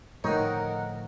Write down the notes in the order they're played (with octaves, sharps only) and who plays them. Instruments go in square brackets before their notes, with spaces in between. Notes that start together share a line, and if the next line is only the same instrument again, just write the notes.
[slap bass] A2 D3 F3 [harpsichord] D#3 C#5 [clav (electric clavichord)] D#4 [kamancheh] A#4 F#5